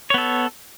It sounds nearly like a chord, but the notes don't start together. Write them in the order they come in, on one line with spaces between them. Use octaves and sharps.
C#5 B3 A4